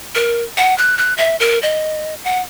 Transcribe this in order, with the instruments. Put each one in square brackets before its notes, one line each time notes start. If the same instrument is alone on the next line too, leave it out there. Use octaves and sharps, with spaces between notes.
[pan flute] A#4
F#5
F#6
F#6
E5
A#4
D#5
F#5